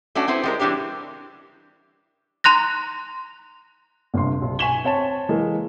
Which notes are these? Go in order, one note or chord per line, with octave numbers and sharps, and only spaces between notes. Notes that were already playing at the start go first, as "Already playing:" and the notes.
A3 C#4 D4 F#4
B3 C4 E4 C5
G3 G#3 A#4
E3 G3 D4 G4 C#5
A#5 C6 F#6 A#6
G1 G2 C3 C6
B1
G#5 C#6 B6 E7 F#7 G7
C4 C#5 A5 E7
E3 G#3 A#3 G#4